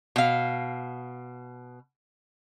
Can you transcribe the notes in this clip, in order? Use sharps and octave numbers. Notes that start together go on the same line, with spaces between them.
B2 F5